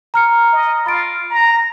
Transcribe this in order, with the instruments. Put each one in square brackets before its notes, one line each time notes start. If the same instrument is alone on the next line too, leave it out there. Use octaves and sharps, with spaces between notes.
[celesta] A#5 F6 C#7
[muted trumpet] D#5
[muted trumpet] F4 [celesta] B5 A6 D7
[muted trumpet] A#5